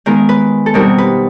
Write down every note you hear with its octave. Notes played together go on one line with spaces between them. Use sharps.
D#3 G#3 B3 A#4
B4
A4
B2 G3 C4 D#4 A#4
B4